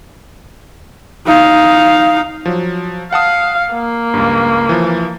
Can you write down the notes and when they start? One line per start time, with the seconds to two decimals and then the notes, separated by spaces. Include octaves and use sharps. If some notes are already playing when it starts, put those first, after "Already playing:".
1.26 D#4 F5
2.46 F3 F#3
3.13 F5 F#5 A5 D#6
3.73 A#3
4.14 C#2 G2
4.69 E3 F3